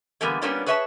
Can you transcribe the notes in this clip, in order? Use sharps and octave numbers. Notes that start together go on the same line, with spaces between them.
D3 E3 G3 A#3 B3
G3 A#3 B3 C#4 D4 F4
G#4 B4 C#5 E5 G5 A5